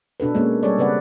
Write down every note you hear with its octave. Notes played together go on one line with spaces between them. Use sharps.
B2 D4 A4 B4
G#3 A#3 C#4 C#5
G3 G#4 A4 C#5 D5
C#3 C4 B4 D5 F#5